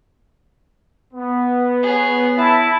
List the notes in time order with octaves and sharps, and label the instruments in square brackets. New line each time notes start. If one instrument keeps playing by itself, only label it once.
[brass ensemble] B3
[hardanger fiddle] G#4 C#5
[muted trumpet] E4 [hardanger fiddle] A5